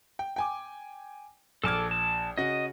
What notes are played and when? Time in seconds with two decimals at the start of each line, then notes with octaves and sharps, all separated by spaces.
0.19 G5
0.36 G5 G#5 D6
1.64 A#1 A4 A5 D6 F6 G#6
1.91 A5
2.38 C#3 F#4 D#5